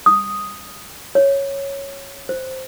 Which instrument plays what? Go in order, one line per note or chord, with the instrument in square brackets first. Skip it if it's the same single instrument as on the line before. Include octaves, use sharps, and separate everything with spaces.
[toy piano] D#6
C#5
C5